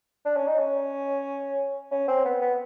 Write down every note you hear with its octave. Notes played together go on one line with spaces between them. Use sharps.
D4
C#4
D#4
C#4
C#4
C4
B3
B3